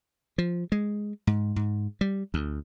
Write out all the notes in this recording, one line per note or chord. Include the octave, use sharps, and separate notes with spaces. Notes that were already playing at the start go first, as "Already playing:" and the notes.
F3
G#3
G#2
G#2
G3
D2